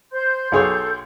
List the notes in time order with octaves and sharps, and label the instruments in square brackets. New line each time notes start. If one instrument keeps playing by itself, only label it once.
[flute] C5 [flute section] C6 G6
[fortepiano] B1 G#4 C#5 [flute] A4